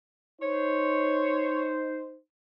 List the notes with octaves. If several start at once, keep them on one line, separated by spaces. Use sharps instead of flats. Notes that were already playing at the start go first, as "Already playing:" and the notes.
D#4 C5 C#5